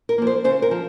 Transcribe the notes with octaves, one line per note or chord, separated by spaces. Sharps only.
A#4
F3 A#3
C5
C#3 C5
A#4
F3